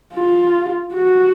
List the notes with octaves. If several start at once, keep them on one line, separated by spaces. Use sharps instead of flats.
F4
F#4